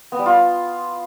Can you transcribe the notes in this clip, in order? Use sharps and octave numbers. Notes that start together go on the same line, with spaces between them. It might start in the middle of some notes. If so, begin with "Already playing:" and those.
B3
G3
F4